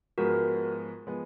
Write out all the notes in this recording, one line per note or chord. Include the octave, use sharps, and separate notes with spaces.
G#2 F3 G#3 B3 F#4 A#4
F3 G#3 B3